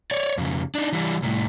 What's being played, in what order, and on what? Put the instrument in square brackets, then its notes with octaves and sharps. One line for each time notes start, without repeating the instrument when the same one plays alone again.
[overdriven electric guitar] C#5 D5
F2 C#3
D4 D#4
E3 G3
C2 A2